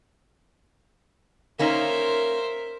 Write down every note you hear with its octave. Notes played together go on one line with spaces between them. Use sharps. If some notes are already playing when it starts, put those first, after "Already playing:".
A#3 C#4 D#4 A#4 C5 E5